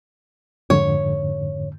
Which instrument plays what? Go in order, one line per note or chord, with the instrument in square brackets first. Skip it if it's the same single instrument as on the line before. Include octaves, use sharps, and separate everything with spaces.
[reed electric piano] F2 G#2 D3 [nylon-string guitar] C#5